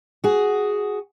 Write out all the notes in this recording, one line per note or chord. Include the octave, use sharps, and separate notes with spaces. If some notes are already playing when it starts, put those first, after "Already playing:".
F#4 G#4